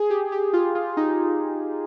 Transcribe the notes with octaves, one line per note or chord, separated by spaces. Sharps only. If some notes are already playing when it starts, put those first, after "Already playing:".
Already playing: G#4
G4
G4
F4
F4
D#4